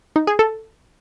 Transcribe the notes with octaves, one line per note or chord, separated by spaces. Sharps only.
D#4
G#4
A4